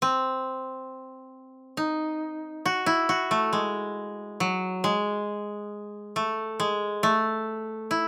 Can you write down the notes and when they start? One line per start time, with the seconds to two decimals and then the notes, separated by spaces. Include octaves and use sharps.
0.02 C4
1.77 D#4
2.66 F#4
2.86 E4
3.09 F#4
3.31 A3
3.53 G#3
4.40 F#3
4.84 G#3
6.16 A3
6.60 G#3
7.03 A3
7.91 E4